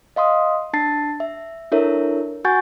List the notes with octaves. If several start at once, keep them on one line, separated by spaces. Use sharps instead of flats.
D#5 F5 C6 D#6
D4 A5 A6 C7
E5
D4 E4 A4 A#4 C#5 E5
F#4 F#5 G#5 C#6 G6 A6